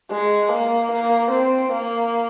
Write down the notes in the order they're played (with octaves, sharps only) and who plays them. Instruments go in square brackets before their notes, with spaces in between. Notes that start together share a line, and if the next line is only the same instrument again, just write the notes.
[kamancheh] G#3
A#3
A#3
C4
A#3